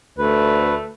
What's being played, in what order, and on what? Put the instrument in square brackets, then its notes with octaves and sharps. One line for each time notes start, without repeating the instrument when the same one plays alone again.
[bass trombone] D2 [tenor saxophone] A3 [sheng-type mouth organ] B4